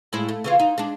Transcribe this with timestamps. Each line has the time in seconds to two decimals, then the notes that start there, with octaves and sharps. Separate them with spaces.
0.13 A2 G#3 E4
0.29 A3
0.44 C#3 E3 F4
0.59 D#4
0.78 G#3 D4